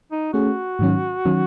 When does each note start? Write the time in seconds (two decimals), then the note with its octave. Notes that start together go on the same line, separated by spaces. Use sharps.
0.12 D#4
0.34 A3 C#4 F#4 G#4
0.79 G#2 D#3 F#3 C#4
1.25 D#3 F#3 C#4